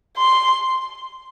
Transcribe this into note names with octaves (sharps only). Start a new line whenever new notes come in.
C6